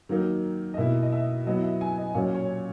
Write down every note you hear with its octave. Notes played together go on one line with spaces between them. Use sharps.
D#3 F#3 A#3 D#4
D#5
B2 A#3 E4 E5
D#5
E5
F#3 B3 E4 D#5
E5
G#5
D#5
A#2 F#3 A#3 C#4 C#5
C#5